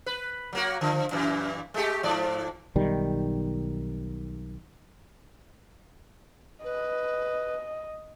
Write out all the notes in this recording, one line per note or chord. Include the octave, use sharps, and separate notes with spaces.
B4
F#3 A#3 F#4
D3 F3
F#2 A#2 E3
G#3 A3 G4
G#2 F3 D5
B1 D#3 G3
B4 D#5